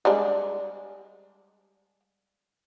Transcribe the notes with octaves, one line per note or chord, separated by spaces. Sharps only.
G3 G#3 D4